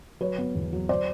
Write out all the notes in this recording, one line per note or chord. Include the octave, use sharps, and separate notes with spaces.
F#3 B4 C#5
B3
E2
F#3
C5 D5